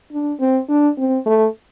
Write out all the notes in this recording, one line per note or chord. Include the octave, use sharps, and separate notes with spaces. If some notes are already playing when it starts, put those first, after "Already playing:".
D4
C4
D4
C4
A3